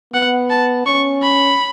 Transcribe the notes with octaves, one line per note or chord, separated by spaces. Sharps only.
B3 F#5
A5
C#4 C#6
B5